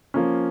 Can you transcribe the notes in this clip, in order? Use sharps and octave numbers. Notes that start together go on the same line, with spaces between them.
F3 A#3 C#4